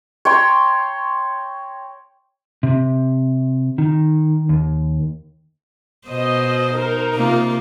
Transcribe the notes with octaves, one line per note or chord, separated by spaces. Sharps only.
C#5 G5 A#5 C6
C3
D#3
D#2
B2 C5 D#5
D#4 A#4
C3 A#3 F4